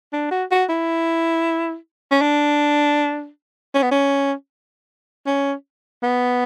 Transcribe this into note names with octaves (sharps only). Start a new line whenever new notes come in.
D4
F#4
F#4
E4
C#4
D4
C#4
B3
C#4
C#4
B3